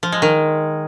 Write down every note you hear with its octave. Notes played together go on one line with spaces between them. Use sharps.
F3
G#3
D#3